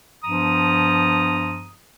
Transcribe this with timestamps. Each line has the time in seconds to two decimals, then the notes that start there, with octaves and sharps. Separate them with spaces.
0.24 G2 F3 B3 A#5 D#6